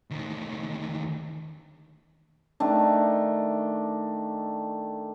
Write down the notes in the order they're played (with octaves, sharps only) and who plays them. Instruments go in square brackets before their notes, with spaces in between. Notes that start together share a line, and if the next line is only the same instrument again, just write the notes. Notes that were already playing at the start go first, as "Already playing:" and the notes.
[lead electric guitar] D2 D#3
[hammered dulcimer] D#3 A3 D4